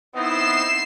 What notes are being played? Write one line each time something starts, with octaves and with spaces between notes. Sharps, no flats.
B3 C4 D#4 E4 C7 E7